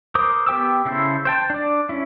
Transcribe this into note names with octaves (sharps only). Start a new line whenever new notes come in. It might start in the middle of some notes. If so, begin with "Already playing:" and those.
A#4 C5 D6 D#6
B3 G4 G5 D6 E6
C#3 E4 A4 C5
C5 G5 A5
D4 D5
C#4 E4